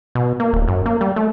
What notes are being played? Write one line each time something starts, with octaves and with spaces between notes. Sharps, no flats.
B2
A#3
D1
F#2
A#3
G3
A3